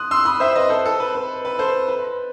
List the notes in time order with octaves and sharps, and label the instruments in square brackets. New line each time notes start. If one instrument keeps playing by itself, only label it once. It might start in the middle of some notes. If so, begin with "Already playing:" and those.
Already playing: [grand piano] C6 D#6 F#6
C6 E6
B5 D#6
C5 E5
B4 D#5
A4 C5
A4
B4
B4
B4
A4 C5
B4